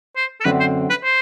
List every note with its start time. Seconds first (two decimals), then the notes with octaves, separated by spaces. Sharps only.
0.16 C5
0.41 A4
0.45 F#2 D3 F#3 C4 B4
0.60 C5
0.90 B4
1.04 C5